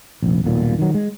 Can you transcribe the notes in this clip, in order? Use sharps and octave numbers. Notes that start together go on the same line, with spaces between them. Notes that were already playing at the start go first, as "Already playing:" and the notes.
F1 A#1
D#1 B1 A#2
D#3 F#3
G#3